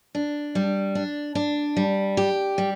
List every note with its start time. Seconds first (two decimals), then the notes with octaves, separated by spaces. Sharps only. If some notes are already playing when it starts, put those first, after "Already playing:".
0.15 D4
0.55 G3
0.95 D4
1.35 D4
1.77 G3
2.17 G4
2.58 G3